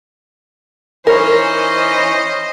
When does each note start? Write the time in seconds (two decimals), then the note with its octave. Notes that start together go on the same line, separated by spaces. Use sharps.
1.07 E3 C#4 D#4 A#4 C5 D#5